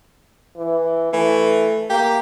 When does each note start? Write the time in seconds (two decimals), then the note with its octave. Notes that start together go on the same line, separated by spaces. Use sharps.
0.57 E3
1.13 E3 A3
1.90 A#3 G4